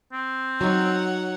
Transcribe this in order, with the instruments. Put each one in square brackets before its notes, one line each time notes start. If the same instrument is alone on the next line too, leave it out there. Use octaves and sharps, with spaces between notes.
[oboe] C4
[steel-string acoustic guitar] F#3 D#4 [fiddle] C#5 F#5